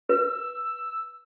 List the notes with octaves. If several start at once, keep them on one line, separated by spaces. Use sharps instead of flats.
B4 E6